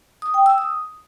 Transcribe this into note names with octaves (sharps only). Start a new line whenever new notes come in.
D#6
G5
E6
D#6